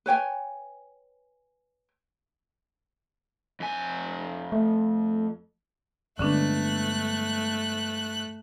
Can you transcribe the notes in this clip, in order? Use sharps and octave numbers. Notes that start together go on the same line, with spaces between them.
B4 C#5 G5 G#5
F2 G#5
A3
G2 D3 G#3 A3 B3 C#4 D4 F#6